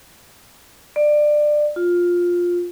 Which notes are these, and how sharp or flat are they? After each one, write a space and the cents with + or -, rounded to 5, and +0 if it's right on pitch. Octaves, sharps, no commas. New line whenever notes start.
D5 +20
F4 +10